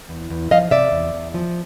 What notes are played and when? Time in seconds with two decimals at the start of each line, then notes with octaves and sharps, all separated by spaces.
0.09 E2
0.30 E2
0.51 F3 D#5 F5
0.71 C3 D5 E5
0.92 E2
1.14 E2
1.34 F3